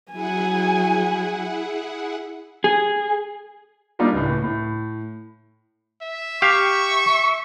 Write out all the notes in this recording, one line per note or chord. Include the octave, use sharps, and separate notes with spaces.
F#3 E4 G#4 F#5 G#5
G#4
G3 A#3 D4 D#4 F4 G4
C#2 A2
A2
E5
G4 F5 C#6